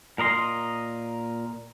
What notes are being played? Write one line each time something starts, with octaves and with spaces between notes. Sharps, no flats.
A#2 A#4 D#5 C6